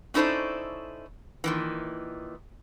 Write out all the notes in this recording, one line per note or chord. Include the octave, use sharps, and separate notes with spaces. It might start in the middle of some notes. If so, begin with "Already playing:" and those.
C#4 D#4 E4 A4 C5 D5
A#2 D#3 E3